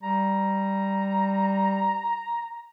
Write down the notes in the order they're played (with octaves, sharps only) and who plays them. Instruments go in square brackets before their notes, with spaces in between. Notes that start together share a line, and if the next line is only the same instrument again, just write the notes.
[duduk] G3 [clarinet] A#5